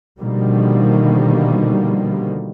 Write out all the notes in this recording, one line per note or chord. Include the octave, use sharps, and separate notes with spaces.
B2 D3 D#3 F3 G3 A#3